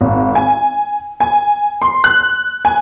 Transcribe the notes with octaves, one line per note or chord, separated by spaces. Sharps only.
G#1
G#5
G#5
C6
F#6
G#5